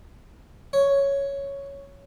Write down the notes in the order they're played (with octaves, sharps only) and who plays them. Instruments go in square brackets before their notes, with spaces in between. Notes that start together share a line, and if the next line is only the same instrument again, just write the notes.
[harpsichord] C#5